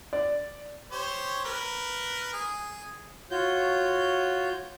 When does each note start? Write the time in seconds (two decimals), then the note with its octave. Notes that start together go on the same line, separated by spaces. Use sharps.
0.13 D5
0.92 G4 C5 C#5
1.45 A#4 B4
2.33 G#4
3.31 F4 F#4 C#5 G6